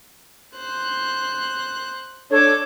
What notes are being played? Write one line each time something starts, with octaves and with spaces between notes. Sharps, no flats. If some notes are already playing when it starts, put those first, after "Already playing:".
C5 F#6
D4 A4 C#5 D6